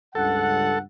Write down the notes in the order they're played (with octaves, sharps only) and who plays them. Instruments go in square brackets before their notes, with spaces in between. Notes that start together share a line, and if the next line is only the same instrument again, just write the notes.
[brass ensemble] C#2 G2 F#5 [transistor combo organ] A4